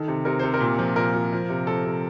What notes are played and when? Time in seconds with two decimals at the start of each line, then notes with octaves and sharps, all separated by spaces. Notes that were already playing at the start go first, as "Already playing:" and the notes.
Already playing: D#3 A4
0.08 C3
0.25 C3 A#4
0.39 C3 C5
0.54 A#4
0.60 A#2
0.79 F3
0.96 A#2 A#4
1.14 F3
1.33 F3
1.50 C3
1.67 F3 A4
1.85 C3